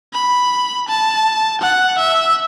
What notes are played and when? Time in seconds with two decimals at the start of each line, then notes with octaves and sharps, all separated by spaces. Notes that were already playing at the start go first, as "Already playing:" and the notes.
0.13 B5
0.88 A5
1.61 F#5
1.98 E5